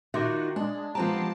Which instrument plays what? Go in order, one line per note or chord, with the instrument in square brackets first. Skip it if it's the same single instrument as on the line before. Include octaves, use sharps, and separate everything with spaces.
[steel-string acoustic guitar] D#3 D#4 F4 [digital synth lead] F#4 [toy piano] E5 C6 D6
[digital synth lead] G#3 [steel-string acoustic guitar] D4
[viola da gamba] F3 G#3 [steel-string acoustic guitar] B3 C4 G4 [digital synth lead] A5 [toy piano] A#5